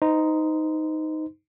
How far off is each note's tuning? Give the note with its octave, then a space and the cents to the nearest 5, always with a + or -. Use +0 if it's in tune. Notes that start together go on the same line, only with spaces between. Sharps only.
D#4 +5 C5 -35 C6 -25